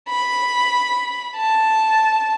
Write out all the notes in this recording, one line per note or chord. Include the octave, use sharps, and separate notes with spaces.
B5
A5